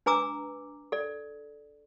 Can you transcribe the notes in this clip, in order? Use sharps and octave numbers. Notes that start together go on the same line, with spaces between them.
D4 B4 G#5 A#5 D6 E6
A4 D5